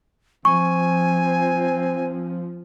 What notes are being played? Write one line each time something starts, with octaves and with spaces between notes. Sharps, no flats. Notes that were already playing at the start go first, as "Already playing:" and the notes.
F3 C4 G#5 C#6